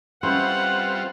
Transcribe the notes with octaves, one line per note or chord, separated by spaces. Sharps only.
G3 C4 C#4 E4 F4 B4 C5 F#5